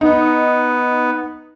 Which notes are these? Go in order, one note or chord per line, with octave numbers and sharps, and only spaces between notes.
B3 D#4